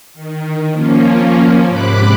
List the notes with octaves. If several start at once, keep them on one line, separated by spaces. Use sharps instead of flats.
D#3
F3 A#3 C#4
G#2 C3 B5 D6 F#6